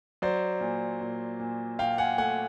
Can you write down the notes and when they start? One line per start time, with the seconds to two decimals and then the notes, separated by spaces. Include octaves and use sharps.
0.22 F#3 C5 D5
0.61 A#2
1.01 A#2
1.40 A#2
1.79 A#2 F5 G5
1.98 F#5 G#5
2.18 A3 F#5 G#5